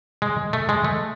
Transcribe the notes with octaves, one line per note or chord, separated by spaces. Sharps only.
G#3
A3
G#3
A3